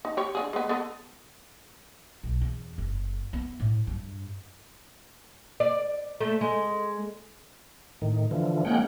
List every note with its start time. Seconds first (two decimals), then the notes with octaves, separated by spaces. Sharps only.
0.05 D#4
0.17 G4 C#5
0.35 D3 F#3 G#4
0.53 G#3 B3
0.69 B3 A4 D#5
2.23 B1
2.41 E2
2.78 F#1
3.33 B3
3.60 A2
3.87 G2
5.60 D5
6.20 A3
6.41 G#3
8.02 A2 D#3
8.31 D3 E3 F3
8.65 G#3 A#3 C#4 F#5 G5